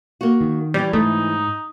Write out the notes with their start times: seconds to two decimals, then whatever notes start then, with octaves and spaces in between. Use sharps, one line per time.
0.21 A#3 F#4
0.40 D#3
0.74 E3 G3 C#4
0.93 G#2 A3 D#4